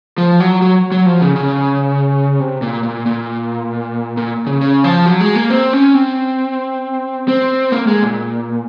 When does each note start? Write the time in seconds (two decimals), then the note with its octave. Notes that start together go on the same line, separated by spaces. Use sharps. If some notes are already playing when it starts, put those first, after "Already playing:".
0.18 F3
0.40 F#3
0.62 F#3
0.92 F#3
1.06 F3
1.21 C#3
1.36 C#3
2.40 C3
2.62 A#2
2.83 A#2
3.06 A#2
4.17 A#2
4.47 C#3
4.61 C#3
4.84 F3
5.06 F#3
5.21 G#3
5.36 A#3
5.50 C4
5.73 C#4
5.94 C4
7.28 C4
7.72 A#3
7.87 G#3
8.02 A#2